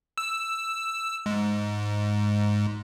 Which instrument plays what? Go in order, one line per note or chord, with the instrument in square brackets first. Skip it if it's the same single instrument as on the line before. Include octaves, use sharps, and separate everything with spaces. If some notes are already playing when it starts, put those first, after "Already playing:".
[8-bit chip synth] E6
G#2